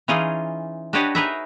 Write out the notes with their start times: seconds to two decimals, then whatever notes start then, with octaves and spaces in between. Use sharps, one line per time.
0.08 E3 C#4 D#4 F4 G#4
0.93 D4 F#4 G4 B4 C#5 D#5
1.15 D#4 G#4 A#4 B4 D#5 E5